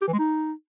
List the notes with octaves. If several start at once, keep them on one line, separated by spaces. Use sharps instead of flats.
G4
E3
G#3
D#4